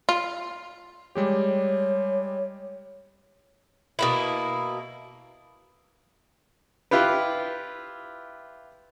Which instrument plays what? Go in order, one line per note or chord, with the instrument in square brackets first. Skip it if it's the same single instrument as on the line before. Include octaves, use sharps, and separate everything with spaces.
[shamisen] F4 [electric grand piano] C6
[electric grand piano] G3 G#3 G4 [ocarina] C#5
[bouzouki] B2 A#3 E4
[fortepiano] E4 F4 G4 B4